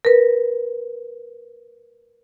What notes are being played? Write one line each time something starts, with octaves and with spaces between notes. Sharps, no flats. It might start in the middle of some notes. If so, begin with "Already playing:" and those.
A#4 B4